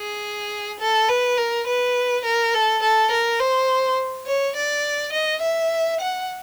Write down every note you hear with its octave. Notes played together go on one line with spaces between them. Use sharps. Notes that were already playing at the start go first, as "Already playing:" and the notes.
Already playing: G#4
A4
B4
A#4
B4
A#4
A4
A4
A#4
C5
C#5
D5
D#5
E5
F#5